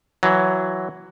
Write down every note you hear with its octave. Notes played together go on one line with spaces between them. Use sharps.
E3 F#3